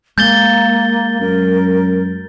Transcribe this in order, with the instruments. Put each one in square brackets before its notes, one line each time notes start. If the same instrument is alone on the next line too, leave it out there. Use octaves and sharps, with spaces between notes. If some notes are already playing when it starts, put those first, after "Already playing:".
[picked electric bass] G#3 [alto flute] A#3 [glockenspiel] G6 A6 G7
[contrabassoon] F#2 [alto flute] A#4